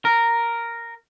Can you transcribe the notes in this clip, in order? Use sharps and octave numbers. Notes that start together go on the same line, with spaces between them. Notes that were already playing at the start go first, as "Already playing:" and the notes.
A#4